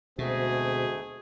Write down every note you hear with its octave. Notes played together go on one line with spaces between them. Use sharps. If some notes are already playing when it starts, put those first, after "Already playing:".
D2 B2 G#3 A3 C4 F#4 G#4